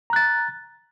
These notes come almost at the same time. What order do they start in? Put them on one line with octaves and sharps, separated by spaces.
A#5 F#6 A6